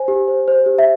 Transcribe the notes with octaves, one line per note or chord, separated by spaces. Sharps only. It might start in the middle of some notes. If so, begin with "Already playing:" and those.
Already playing: C5 G#5
G4
C5
C5
G4
E5